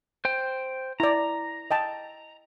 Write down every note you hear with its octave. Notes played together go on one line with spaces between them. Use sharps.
C5 G5
E4 D5 A#5
D#5 G5 A5